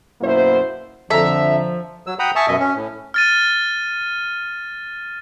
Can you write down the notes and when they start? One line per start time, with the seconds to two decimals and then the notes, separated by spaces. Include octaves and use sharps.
0.21 F#2 B2 A#3 E4 C5
1.10 F2 D3 F3 A4 E5 A#5
2.07 F#3 E6
2.19 F#5 G5 A#5 B5 D#6
2.36 E5 G#5 A5 C#6 D#6
2.48 F#2 B2 D#5 E5
2.60 C#4
2.76 A2
3.14 F6 A6 D#7